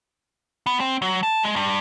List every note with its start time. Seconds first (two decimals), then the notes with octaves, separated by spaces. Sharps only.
0.66 B3
0.80 C4
1.02 F#3
1.23 A5
1.43 G#3
1.56 G2